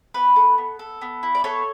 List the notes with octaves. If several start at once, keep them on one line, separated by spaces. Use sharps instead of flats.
B3 B4
A4
B3
A4
B3
E4
D5
B3 A4 C#5